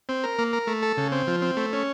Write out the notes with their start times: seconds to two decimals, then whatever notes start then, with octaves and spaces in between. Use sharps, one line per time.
0.09 C4
0.24 A#4
0.39 A#3
0.53 A#4
0.67 A3
0.82 A4
0.97 C#3
1.12 C4
1.27 F3
1.42 C4
1.57 A3
1.73 C#4